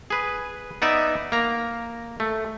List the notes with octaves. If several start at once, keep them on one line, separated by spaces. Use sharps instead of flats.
G#4 B4
B3 D#4 D5 E5
A#3 A#5
A3